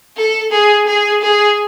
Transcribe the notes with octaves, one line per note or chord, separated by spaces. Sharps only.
A4
G#4
G#4
G#4